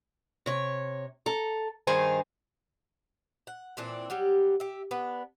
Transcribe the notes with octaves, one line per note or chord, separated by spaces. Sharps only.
C3 C#5
A4 A#5
G2 D#3 D#4 G#4 C5 G#5
F#5
A#2 E3 C4 D4
F#3 G3 G4
G4 E5
B3 D4 B4